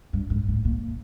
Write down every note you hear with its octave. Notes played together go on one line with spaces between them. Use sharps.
G2
G#2
A2
A#2